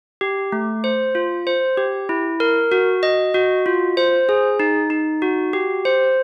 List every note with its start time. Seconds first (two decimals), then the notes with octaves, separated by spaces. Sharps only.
0.21 G4
0.52 A3
0.84 C5
1.15 F4
1.47 C5
1.77 G4
2.09 E4
2.40 A#4
2.72 F#4
3.03 D#5
3.34 F#4
3.66 F4
3.97 C5
4.29 G#4
4.60 D#4
4.90 D#4
5.22 F#4
5.53 G4
5.85 C5